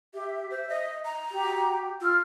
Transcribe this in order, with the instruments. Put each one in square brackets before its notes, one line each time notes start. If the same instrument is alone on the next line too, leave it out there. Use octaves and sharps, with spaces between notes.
[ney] G4 [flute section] E5
[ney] C5
D#5
A#5
[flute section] F#4 G4
[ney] F4 [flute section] E6 F6